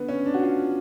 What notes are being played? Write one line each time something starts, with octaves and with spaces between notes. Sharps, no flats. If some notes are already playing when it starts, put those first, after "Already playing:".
Already playing: D3 B3
C#4
D4
F#4
F4